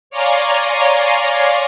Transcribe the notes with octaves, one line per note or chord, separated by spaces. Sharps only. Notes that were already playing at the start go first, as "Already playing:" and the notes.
C#5 D5 F5 G#5 A#5 C6